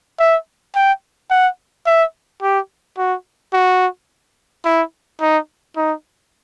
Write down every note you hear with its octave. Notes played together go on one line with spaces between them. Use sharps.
E5
G5
F#5
E5
G4
F#4
F#4
E4
D#4
D#4